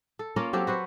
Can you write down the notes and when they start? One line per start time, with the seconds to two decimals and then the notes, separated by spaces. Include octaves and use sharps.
0.19 A4
0.36 A#3 C#4 F4 A#4
0.53 F#3 C4 G4 A4
0.67 F#4 B4 C5